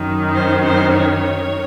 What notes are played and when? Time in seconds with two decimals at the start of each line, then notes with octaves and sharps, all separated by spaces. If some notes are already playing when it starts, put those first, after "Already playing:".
Already playing: F#2 D#3
0.34 C5
0.64 C5
0.94 C#5